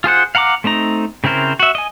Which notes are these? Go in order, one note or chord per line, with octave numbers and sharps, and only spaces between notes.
F4 G#4 C5 F#5
F5 F#5 A#5 B5 D6
A3 C4 D#4 A#5
C#3 C4 E4 A#4 C5
F#4 E5
D#5 G#5